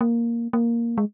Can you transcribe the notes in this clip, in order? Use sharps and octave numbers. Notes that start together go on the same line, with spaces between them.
A#3
A#3
G#3